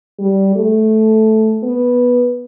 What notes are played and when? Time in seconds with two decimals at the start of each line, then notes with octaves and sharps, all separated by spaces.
0.19 G3
0.56 A3
1.63 B3